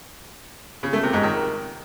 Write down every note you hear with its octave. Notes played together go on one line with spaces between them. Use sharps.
C#3
A3
C3
G#2
D#3